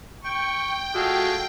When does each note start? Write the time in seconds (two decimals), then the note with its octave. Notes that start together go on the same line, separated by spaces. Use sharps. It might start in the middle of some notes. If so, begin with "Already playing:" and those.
0.24 G5 C#6
0.95 G#3 A3 F4 F#4